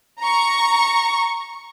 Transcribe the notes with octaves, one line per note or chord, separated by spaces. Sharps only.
A#5 C#6